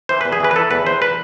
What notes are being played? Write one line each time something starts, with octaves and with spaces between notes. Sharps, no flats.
E3 C5
E2 B4
G#4
E3 B4
B4
E3 A4
E2 B4
E2 C5
B4